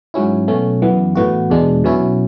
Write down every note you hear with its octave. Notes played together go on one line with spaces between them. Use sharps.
G#2 F#3 C#4 E4
B2 F#3 A3 C#4
F#2 E3 B3
A2 E3 B3 F#4
E2 B2 G#3 D4
B2 F#3 C#4 E4